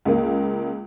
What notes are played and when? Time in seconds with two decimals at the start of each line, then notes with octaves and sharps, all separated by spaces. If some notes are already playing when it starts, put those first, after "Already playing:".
0.05 C#2 A#3